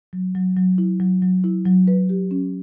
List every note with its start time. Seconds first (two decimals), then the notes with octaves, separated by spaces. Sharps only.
0.13 F#3
0.35 F#3
0.56 F#3
0.78 E4
1.00 F#3
1.22 F#3
1.44 E4
1.65 F#3
1.88 B4
2.09 G4
2.31 C#4